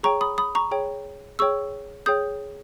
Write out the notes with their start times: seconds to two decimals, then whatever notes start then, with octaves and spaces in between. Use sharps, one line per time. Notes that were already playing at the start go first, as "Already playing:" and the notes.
0.03 G#4 C#5 G5 A#5 C#6
0.21 B5 D#6
0.38 B5 D#6
0.55 A#5 C#6
0.71 G#4 C#5 G5
1.39 G#4 C#5 G5 C#6 E6
2.06 G#4 C#5 G5 D#6 G6